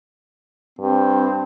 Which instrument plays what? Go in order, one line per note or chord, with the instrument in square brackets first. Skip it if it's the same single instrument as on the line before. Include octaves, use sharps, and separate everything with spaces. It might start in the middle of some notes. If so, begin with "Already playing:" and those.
[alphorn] G2 [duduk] C4